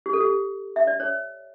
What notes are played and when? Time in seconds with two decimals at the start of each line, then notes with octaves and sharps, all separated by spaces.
0.06 G4
0.13 A4
0.20 G4
0.76 E5
0.87 D5
1.00 C#5